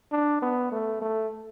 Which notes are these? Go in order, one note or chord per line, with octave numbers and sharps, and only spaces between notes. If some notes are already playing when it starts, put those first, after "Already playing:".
D4
B3
A3
A3